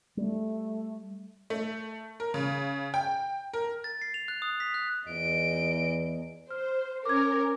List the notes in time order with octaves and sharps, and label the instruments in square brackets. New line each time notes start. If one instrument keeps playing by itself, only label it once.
[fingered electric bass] G3 [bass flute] A3
[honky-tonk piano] A3
A#4
C#3
G5
A#4
[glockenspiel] A6
C7
F7
F#6
D#6
B6
F#6
[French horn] E2 [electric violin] D#5 D7
[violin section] C5 [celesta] F6
[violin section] C#4 A#4 [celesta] D6 G#6